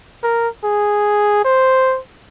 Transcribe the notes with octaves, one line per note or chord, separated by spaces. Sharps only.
A#4
G#4
C5